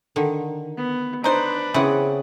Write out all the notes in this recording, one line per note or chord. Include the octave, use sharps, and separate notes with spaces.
D3 D#3
B3
D4 D#4 B4 C5
C#3 E3 B3 C4 F#5